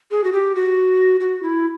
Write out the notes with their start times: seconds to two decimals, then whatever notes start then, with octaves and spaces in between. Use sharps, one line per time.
0.11 G#4
0.24 F#4
0.33 G4
0.55 F#4
1.20 F#4
1.43 E4